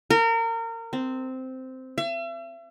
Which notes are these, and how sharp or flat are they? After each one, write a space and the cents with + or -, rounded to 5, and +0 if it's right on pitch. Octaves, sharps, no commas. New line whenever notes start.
A#4 -30
C4 -10
E5 +40